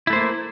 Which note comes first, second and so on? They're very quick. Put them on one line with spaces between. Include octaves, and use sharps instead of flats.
E4 A3 C5 A#3